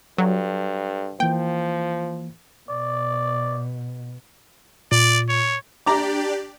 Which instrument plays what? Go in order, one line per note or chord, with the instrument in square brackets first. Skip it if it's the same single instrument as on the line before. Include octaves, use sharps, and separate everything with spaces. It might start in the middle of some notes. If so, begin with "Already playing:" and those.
[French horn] G2 [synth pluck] F#3 [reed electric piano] A4
[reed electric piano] E3 A#3 [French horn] F3 [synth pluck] G5
[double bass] B2 [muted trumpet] D5
[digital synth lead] A#2 [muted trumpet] D5
[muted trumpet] C#5
[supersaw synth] D4 G4 D5 [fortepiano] A#5 D6